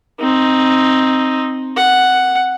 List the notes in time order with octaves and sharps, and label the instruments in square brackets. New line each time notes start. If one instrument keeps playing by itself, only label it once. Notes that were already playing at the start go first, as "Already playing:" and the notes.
[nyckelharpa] C4 D#4
F#5